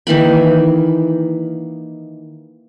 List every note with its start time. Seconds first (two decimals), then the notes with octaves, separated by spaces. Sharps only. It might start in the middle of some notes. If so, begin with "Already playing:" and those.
0.07 D#3 E3 A#3 B5